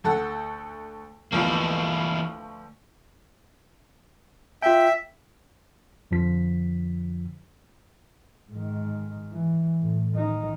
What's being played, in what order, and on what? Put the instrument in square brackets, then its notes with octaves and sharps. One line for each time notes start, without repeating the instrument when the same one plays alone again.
[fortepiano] D2 A4 F#5
[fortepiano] D2 F3 B3 [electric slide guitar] E3 A#3
[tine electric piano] F4 G5 [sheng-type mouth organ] E5
[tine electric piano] F2 D3 F3 B6
[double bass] G#2 D#3
E3
A2
D#3 D#4